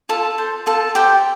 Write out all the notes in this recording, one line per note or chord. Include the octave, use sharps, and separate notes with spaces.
F4 A4 A5
C5
F4 A4 A5
G4 C5 G5